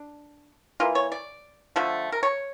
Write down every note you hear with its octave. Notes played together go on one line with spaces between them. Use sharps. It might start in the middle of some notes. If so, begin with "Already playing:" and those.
Already playing: D4
E3 A#3 F4
C#5
D5
D3 F3 A3
A#4
C#5